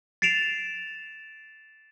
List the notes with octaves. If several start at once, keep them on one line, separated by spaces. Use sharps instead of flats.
A6 C7 D7 E7 F7